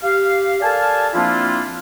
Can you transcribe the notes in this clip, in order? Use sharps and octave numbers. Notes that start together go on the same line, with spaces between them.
G4 F5
A4 A#4 D5 F5 G#5 A5
F3 A#3 C4 D4 E4 F4